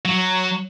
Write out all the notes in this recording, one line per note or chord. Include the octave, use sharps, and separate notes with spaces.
F#3